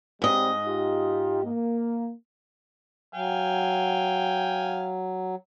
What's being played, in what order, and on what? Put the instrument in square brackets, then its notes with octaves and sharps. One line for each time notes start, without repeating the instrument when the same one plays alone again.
[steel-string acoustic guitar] G#2 D#5 [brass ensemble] G3 C4
[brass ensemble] D#4 F4 G4
A#3
[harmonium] F#3 [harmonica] F5 G5 G#5